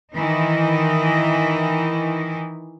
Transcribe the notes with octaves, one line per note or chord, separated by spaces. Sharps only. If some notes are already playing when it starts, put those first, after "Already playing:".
D#3 E3 D#4